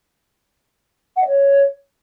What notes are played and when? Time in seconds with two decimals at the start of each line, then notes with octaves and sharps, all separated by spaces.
1.16 F#5
1.22 D#5
1.27 C#5